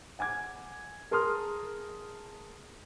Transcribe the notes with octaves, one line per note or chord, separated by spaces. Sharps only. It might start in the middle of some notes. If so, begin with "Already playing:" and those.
F#5 G#5 D6 G#6
G#4 A#4 A5 C6 D#6 F6